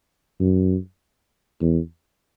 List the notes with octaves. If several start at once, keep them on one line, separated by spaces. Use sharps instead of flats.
F#2
E2